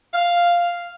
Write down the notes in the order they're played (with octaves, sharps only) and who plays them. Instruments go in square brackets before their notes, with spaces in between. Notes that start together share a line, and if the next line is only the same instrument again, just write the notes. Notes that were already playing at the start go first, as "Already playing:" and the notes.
[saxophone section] F5